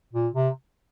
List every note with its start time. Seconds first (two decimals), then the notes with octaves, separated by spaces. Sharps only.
0.13 A#2
0.34 C3